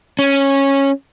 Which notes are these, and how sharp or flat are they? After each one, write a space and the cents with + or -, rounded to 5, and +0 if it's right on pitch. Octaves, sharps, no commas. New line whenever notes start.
C#4 -10